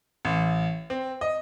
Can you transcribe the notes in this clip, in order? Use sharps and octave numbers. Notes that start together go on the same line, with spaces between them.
A1
C4
D#5